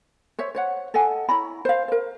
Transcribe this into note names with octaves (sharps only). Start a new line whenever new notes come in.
C5 C#5 E5
C5 C#5 F#5
A4 D#5 F#5 G#5
E4 C#5 A#5 B5
C5 F5
A#4 C5